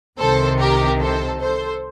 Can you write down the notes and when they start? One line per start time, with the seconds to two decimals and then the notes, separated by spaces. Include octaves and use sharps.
0.18 C2 C3 D#3 A4 C5
0.59 G4 A#4
1.00 A4 C5
1.41 A4 C5